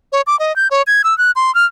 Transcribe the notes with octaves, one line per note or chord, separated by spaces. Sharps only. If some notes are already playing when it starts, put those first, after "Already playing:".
C#5
D6
D#5
G6
C#5
G#6
E6
F#6
C6
F6